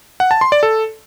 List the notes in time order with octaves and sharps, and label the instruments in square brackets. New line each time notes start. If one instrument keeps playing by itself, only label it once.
[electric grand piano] F#5
A5
C6
D5
A4